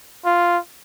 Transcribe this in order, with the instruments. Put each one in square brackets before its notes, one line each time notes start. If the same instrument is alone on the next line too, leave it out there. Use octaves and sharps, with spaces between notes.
[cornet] F4